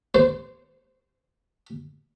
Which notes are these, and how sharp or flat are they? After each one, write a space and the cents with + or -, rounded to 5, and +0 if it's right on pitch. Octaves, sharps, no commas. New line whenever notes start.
C5 -15